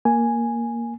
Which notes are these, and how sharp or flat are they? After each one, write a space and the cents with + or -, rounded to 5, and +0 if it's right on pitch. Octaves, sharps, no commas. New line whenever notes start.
A#3 +0 G#5 +0